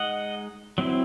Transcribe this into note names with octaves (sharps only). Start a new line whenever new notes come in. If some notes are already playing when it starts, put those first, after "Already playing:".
Already playing: G#3 D#4 D#5 F#5
F#3 C4 E4